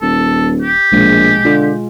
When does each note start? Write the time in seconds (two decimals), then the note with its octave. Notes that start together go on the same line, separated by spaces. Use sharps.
0.02 D#1 A4
0.62 G4
0.92 A#1 B2 G#3
1.45 D3 F4